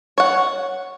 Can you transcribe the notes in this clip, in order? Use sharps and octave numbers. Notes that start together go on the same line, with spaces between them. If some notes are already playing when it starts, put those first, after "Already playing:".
C#5 F#5